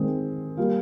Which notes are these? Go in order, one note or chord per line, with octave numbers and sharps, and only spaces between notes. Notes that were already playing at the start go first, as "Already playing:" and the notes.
Already playing: D#3 G#3 C4
G3 A#3 F4